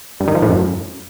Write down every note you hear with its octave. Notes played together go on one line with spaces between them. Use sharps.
G2
D#3
F3
A2
F#2